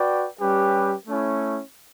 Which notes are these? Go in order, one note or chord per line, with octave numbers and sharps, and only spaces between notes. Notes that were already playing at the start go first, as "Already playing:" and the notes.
Already playing: F#4 B4 D5 G5
G3 C#4 G4 B4
A3 C#4 E4